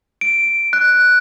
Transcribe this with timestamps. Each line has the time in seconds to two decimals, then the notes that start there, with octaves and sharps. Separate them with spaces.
0.21 D7
0.73 F#6